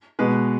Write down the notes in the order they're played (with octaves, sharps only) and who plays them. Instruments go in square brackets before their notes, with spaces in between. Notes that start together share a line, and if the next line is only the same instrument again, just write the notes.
[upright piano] B2 G#3 B4